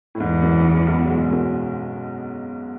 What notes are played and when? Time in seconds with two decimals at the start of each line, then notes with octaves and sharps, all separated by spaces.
0.15 A2
0.20 E2 G#2
0.42 F#2
0.65 G#2
0.87 B1 B2
1.05 F#3
1.10 G#2 G#3
1.31 F#2 F#3